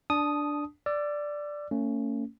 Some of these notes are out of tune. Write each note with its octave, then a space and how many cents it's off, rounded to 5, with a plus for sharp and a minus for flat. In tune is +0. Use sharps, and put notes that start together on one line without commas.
D4 +0 A5 -20 D#6 +0
D5 +0 E6 +40
A3 +45 C#4 +0